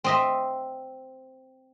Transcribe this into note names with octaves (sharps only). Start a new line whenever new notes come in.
C4 D#5 E5